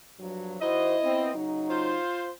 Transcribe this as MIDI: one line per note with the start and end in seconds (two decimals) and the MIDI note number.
0.20 0.56 43
0.20 0.56 53
0.20 0.56 54
0.61 0.95 51
0.61 1.34 64
0.61 0.95 66
0.61 0.95 72
0.61 1.34 75
1.04 1.33 59
1.04 1.33 60
1.35 1.99 49
1.35 1.99 54
1.35 1.99 63
1.70 2.32 65
1.70 2.32 72